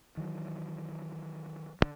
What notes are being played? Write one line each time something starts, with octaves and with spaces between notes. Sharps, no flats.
D#3 E3 F#3
D2 D3